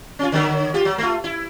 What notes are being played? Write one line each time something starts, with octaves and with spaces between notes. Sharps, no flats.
C#4 F4
D3 F#3 B3
F4 G4
F#3
A3 F4
E4